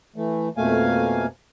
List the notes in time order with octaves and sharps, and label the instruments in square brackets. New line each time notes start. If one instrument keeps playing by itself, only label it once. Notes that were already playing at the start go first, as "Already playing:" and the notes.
[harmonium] E3 A3
F2 B2 A3 A#3 F5 G#5